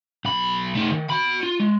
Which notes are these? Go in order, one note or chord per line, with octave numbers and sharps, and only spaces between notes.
B1 B5
A3 D#4
D#3
F#4 B5
F4
G#3